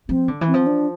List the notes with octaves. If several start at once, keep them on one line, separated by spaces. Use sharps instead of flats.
F3 C4
D3
E3
C4
F3
D4